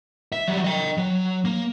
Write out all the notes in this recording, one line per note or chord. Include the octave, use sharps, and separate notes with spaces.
E5
F#3 G3
D#5 G5
F#3
A#3